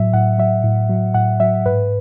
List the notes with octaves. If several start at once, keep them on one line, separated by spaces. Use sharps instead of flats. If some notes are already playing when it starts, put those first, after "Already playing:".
Already playing: A2 F#3 E5
A2 F#5
F#3 E5
A2
F#3
A2 F#5
F#3 E5
G#2 B4